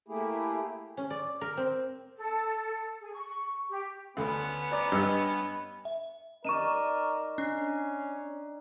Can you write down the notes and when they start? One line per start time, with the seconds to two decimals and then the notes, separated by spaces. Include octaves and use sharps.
0.08 A3 A#3 E4 G4 G#4
0.97 C#4
1.10 D5
1.41 A#4
1.57 C4
2.17 A4
3.00 G#4
3.13 C#6
3.69 G4
4.17 D2 A3 B3 C#4 B4
4.71 D5 A#5 D6
4.92 G2 D#5 G5 E6
5.85 E5
6.45 D#4 A#4 D5 C#6 D#7 E7
7.38 C#4 D4